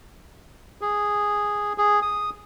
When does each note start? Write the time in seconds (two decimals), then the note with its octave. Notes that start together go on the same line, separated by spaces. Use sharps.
0.81 G#4
1.78 G#4
2.02 D#6